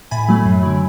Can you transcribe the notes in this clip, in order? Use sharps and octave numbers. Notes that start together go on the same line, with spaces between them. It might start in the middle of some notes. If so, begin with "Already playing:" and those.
A2 G#5 B5
F#3 A3
F#2
D3 F#3